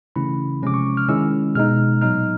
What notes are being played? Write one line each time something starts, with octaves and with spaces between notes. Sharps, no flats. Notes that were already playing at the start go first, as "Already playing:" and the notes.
C#3 E3 A3 C#4 E4 B5
C3 F3 G#3 C#4 D6
C#6
F6
D#3 G#3 C#4 E4 E6
B2 G#3 B3 D#4 F6
A#2 F#3 B3 D#4 F6